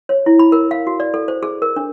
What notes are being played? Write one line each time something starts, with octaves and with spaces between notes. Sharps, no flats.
C#5
E4
B5
A#4
F5
F#4
D5
A4
C5
G#4
A#4
D4